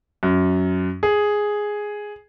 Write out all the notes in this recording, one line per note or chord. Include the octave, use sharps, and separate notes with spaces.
F#2
G#4